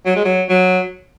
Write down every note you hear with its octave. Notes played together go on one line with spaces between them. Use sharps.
F#3
G#3
F#3
F#3